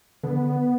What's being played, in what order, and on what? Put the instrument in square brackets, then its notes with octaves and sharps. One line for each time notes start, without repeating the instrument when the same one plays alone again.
[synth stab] D3 [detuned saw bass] B3